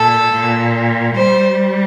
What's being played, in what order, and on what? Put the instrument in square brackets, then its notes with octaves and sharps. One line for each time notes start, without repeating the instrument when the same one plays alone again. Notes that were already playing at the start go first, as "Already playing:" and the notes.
Already playing: [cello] A#2 [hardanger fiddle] A4
[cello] A#2
[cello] G3 [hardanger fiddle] C5